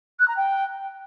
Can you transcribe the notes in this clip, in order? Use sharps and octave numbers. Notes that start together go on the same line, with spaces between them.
F#6
A#5
G5